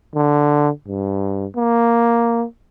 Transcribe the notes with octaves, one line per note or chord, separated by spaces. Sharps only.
D3
G2
A#3